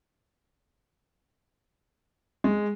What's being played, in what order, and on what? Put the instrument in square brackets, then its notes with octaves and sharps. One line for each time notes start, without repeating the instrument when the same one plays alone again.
[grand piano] G#3